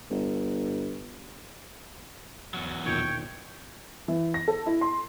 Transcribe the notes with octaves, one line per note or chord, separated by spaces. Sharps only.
G1
E2 F#3
E1 A#2 D#3 C#5 G5
E3
A#6
A4
E4
C6